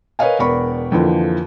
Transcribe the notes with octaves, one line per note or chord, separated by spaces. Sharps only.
A#4 B4 C#5 D#5 F5 G#5
E1 B3 A#4 D5 B5 C#6
F2 D3 E3 F3 A#3